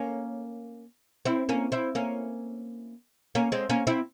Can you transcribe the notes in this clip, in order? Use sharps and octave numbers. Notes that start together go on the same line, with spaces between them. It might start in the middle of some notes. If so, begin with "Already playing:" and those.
Already playing: A#3 C#4
C4 E4
A#3 C#4
C4 E4
A#3 C#4
A#3 C#4
G#3 C4
A#3 C#4
C4 E4